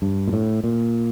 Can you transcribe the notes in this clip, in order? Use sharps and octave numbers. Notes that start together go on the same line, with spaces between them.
G2
A#2
A2
A#2